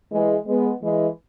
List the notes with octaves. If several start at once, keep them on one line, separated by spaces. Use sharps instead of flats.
E3 G#3
G#3 B3
E3 G#3